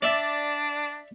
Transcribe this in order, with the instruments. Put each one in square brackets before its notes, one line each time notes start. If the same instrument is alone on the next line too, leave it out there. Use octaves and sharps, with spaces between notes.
[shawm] D4 [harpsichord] D5 E5